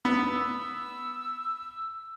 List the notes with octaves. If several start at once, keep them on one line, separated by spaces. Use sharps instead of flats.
B3 E6